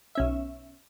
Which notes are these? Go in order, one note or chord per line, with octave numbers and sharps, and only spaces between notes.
B1 C#4 E5